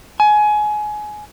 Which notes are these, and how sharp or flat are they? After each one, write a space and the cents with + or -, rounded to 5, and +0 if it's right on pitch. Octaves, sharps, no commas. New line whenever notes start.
G#5 +20